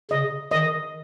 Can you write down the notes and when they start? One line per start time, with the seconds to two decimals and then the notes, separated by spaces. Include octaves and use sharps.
0.11 C#3 D#5
0.52 D#3 D#5